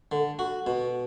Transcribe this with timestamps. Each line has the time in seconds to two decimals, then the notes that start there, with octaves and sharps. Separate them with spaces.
0.12 D3
0.39 F#4
0.67 B2